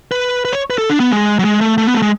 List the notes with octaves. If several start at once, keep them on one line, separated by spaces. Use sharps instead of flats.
B4
B4
C#5
B4
A4
D4
B3
G#3
F#3
G#3
A3
A3
B3
A3
G#3